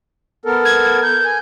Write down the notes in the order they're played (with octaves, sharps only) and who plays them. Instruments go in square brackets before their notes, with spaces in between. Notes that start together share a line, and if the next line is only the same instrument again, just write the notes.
[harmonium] B3 A4 A#4
[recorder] G#6
G6
[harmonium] G#5